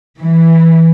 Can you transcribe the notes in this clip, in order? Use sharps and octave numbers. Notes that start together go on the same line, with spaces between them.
E3